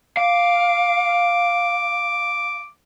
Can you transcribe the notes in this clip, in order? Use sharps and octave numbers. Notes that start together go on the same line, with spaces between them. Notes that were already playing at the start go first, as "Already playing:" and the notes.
F5 D6